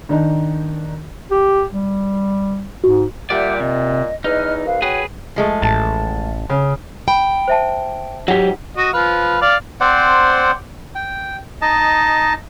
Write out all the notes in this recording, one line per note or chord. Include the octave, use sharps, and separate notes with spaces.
D#3 D4 D#4
G4
G3
G#2 F#4
A#2 G3 G4 D5 E5 F#5
C3 D#5
E2 D#4 B4 D#5 F6
C2 B4 F5
F#4 G#4 B4 C#5 G5
F3 G#3 A3
A1 A5
C#3
G5 B5
C5 E5 A5
G#2 F#3 G4 F#5
F#4 D#5
F3 B4 F5
D5 F5
C4 C5 D5 F#5
G5
D#4 D#5 A5